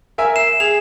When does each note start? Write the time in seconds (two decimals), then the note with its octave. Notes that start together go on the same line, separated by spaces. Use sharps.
0.18 A#4 E5 G#5
0.36 C7 E7
0.60 G#4 F7